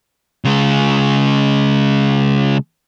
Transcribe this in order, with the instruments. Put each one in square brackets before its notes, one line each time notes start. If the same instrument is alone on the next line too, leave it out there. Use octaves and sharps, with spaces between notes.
[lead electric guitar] C#3 G#3